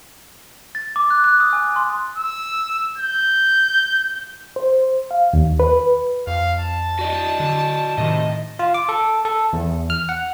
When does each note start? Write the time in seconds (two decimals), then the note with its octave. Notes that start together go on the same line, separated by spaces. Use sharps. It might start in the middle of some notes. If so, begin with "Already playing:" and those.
0.75 A6
0.96 D6
1.10 F#6
1.24 F#6
1.40 D#6
1.53 G#5
1.76 C6
2.18 E6
2.98 G6
4.56 C5
5.11 F5
5.33 D#2
5.60 B4
6.27 F2 F5
6.60 A5
6.99 F#4 D5 D#5
7.40 D3
7.98 A2 C3 D#3 D#5
8.59 F4
8.74 D6
8.89 A4
9.25 A4
9.53 E2
9.90 F6
10.09 F#5